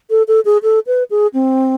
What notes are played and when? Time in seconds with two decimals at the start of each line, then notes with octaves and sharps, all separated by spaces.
0.10 A4
0.28 A4
0.45 G#4
0.63 A4
0.87 B4
1.11 G#4
1.34 C4